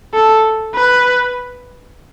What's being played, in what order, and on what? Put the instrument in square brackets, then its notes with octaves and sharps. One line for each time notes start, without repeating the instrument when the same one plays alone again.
[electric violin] A4
B4